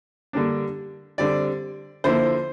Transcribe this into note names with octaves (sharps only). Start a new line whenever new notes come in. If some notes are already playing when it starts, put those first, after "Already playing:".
D3 G3 A#3 D4
D3 G3 C4 D5
D3 F3 A#3 E4 C5